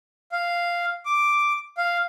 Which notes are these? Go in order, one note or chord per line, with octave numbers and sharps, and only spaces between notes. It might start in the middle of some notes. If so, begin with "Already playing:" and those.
F5
D6
F5